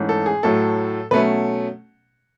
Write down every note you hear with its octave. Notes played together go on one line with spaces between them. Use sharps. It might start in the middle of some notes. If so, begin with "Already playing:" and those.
Already playing: G#2 E3 A3 C#4
A4
G#4
A2 F#3 A3 A4
B2 F#3 A3 C#4 B4